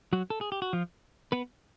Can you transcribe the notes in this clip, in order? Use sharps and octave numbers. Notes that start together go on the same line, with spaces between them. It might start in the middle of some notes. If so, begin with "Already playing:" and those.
F#3 F#4
A4
G#4
G4
F#4
F3 F4
B3 B4